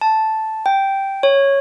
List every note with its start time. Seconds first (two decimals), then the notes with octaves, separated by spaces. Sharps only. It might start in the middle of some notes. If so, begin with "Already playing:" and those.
0.01 A5
0.66 G5
1.23 C#5